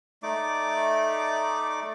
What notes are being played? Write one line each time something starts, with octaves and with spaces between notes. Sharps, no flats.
A3 D#4 D5 D6